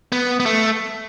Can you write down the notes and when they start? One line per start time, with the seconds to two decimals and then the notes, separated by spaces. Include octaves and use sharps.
0.12 B3
0.40 B3
0.46 A3